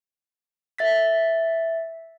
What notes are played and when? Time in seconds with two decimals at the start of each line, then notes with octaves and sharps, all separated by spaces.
0.78 E5 A6 B6